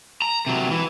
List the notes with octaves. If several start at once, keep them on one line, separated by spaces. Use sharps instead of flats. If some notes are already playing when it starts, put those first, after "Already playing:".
A#5
C3 F#3
E3